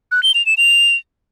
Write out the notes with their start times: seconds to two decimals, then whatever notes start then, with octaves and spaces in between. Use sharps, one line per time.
0.12 F#6
0.23 G7
0.35 F7
0.46 E7
0.58 F7